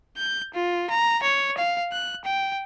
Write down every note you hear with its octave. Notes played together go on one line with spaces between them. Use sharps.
G6
F4
A#5
C#5
F5
F#6
G5